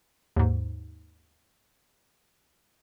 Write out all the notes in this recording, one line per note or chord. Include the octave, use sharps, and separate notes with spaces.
D#2 G#2